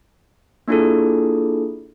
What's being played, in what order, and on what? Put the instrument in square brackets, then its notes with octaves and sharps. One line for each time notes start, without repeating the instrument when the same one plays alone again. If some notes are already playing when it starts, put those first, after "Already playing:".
[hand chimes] A#3 D4 E4 F4 G#4 A4